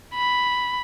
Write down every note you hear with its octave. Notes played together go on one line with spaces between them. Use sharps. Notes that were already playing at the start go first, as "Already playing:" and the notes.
B5